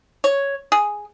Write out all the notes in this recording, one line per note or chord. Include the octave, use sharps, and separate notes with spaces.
C#5
G#4